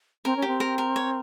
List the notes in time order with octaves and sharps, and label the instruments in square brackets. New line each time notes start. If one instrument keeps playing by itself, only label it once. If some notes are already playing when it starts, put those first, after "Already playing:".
[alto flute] C4 [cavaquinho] A#4
[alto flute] C#4
[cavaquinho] G4
[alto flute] C4
[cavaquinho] A#4
A#4
C#5